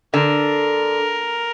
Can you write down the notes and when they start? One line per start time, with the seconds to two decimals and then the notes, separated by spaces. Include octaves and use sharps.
0.13 D3 A#4